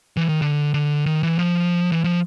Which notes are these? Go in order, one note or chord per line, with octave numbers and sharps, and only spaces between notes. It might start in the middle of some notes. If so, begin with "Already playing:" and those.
E3
D#3
D3
D3
D#3
E3
F3
E3
F3